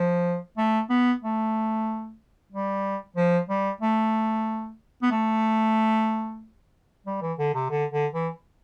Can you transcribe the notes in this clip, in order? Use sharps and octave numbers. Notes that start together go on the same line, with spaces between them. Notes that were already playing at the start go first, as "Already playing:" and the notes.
Already playing: F3
A3
B3
A3
G3
F3
G3
A3
B3
A3
G3
E3
D3
C3
D3
D3
E3